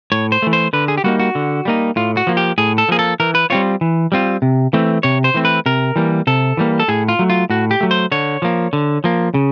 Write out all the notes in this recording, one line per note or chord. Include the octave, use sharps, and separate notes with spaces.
A2 C#5
C5
E3 A3
C5
D3 B4
G#4
G4
G3 A#3 D#4 F#4
F#4
D3
G3 A#3 D#4
A2 F4
F#4
F3 A#3
G4
A2 G#4
A4
F3 A#3 G#4
A4
E3 A#4
B4
G3 C4 F4 C#5
E3
G3 C4 F4
C3
E3 A3 C4
C3 C#5
C5
E3 A3 C4
B4
C3 A#4
E3 G3 A#3
C3 A4
E3 G3 A#3
A4
A2 G#4
F4
F#3 A3
F4
A2 F#4
G4
F#3 A3
C5
D3 C#5
F3 A#3
D3
F3 A#3
C#3